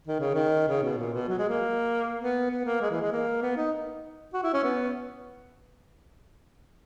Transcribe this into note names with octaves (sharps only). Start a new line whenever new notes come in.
D#3
C#3
D#3
C#3
B2
A#2
B2
F#3
G#3
A#3
B3
B3
A#3
G#3
E3
G#3
A#3
B3
D#4
F#4
E4
C#4
B3